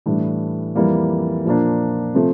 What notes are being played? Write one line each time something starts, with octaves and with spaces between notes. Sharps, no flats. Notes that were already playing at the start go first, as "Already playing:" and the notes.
A2 E3 G3 D4
F2 E3 G3 A#3
A#2 F3 A#3 D4
C3 F3 A3